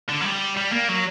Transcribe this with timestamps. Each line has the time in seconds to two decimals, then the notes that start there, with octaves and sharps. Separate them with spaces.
0.09 D3
0.21 F#3
0.25 G3
0.57 G3
0.72 A#3
0.89 F#3